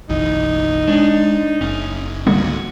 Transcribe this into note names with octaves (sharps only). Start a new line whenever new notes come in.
F#1 B1 E3 D#4
G#3 D4 C#5
F#1 C#4
C#2 G#2 D3 G3 A#3 F#4